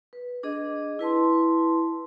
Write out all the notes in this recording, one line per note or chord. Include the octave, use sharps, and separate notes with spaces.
B4
D4 G#4 D#5
E4 B4 A5 C6